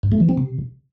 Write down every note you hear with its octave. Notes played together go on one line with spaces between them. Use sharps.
G2
A3
E3
C4
C3